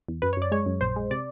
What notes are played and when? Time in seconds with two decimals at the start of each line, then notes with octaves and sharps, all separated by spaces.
0.08 E2
0.22 F#2 B4
0.33 C#5
0.37 F#2 D5
0.52 G#3 C#5
0.66 F#2
0.81 A#1 C5
0.96 G#3
1.11 C3 D5